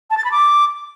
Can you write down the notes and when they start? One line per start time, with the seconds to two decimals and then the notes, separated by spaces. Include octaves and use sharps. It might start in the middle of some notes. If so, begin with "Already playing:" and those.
0.10 A5
0.17 A6
0.24 B5
0.31 D6